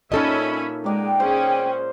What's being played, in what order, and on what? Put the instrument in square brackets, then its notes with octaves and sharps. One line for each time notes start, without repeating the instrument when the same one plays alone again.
[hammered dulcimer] A#2 [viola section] C#4 E5 B5 [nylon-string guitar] D#4 A4 D#5
[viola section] G#3 [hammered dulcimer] A#4 D5 F#5 [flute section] G5
[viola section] C#4 G#4 [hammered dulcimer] C5